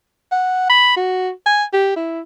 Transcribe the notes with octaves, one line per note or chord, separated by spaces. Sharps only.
F#5
B5
F#4
G#5
G4
E4